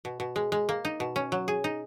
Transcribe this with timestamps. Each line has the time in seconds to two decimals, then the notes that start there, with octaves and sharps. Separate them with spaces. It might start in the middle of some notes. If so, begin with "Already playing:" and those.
0.05 B2
0.20 B2
0.36 G#3
0.52 G#3
0.69 A#3
0.85 D#4
1.00 B2
1.16 C#4
1.32 F#3
1.48 G#4
1.64 D#4